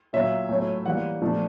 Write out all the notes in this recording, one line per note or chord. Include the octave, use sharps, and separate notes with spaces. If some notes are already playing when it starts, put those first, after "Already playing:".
A#2 F#3 A#3 C#4 F4 E5
A2 F#3 A3 C#4
E3 G3 A#3 F#5
A#2 F3 A3 D4